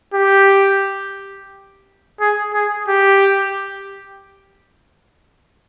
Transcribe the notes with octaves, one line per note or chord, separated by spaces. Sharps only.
G4
G#4
G#4
G4